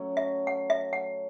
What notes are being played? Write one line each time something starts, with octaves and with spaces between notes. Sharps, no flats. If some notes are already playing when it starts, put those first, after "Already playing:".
Already playing: F#3 A3 C#4
E5
F#5
E5
F#5